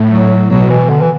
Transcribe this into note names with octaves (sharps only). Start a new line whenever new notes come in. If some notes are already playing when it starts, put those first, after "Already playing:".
Already playing: A2
F#3
B2 F#3
E3
D3
E3